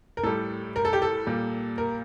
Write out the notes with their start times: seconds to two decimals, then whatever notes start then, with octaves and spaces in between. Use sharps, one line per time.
0.17 A#4
0.23 A2 G3 A4
0.76 A#4
0.85 A4
0.93 G4
1.02 A4
1.27 A#2 G3
1.78 A#4